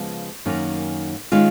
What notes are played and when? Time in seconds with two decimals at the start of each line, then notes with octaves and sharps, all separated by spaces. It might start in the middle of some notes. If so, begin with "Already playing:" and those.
Already playing: C#3 F3 G#3 B3
0.46 F#2 D#3 A#3 C#4
1.32 D#3 G#3 C#4 F4